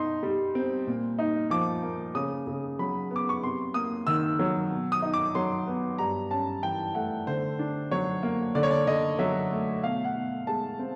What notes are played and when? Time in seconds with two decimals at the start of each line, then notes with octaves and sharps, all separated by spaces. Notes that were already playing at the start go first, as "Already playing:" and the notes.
Already playing: B2 D#4 C6
0.23 G3
0.55 C4
0.87 A#2
1.19 D#4
1.50 F3 D6
1.83 A#3
2.15 C#3 D#6
2.47 C#3
2.79 F#3 B5
3.11 B3
3.16 D6
3.29 C#6
3.43 C3 C6
3.74 A#3 D#6
4.07 D#3 E6
4.39 F#3
4.71 B2
4.92 D#6
5.02 D#4
5.14 D6
5.35 F#3 C6
5.67 B3
5.98 G2 A#5
6.31 C#4 A5
6.63 E3 G5
6.95 A3 F#5
7.27 D3 C5
7.59 D4
7.91 F#3 C#5
8.23 A#3
8.55 D3 D5
8.63 C#5
8.71 D5
8.87 D3 D#5
9.19 F#3 E5
9.51 A3
9.83 B2 F5
10.04 F#5
10.15 B2
10.47 G#3 A5
10.79 C4